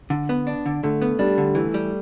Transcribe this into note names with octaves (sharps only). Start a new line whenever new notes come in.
D3
B3
D4
D3
D3 A3
B3
G3 D4
D3
E3 A3
G3